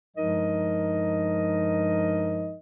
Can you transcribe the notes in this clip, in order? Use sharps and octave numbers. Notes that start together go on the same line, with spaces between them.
G2 F3 G#3 D#4 A#4 D#5